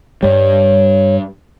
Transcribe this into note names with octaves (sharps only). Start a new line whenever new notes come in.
G2 G3 C#5